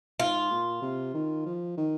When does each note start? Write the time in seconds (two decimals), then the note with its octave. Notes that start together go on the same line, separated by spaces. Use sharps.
0.20 G#2 F4
0.51 A#2
0.82 C3
1.14 D#3
1.46 F3
1.77 D#3